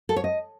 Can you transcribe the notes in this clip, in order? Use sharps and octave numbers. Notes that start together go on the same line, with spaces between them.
A4
C#5
D#5